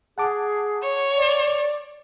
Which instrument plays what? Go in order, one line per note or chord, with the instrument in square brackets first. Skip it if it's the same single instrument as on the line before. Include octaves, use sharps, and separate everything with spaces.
[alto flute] G#4 [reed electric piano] F#5 A5 D6
[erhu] C#5
[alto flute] D5